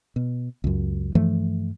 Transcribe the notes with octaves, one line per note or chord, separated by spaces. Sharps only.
B2
C#2 F#2
G2 E3 F3 A3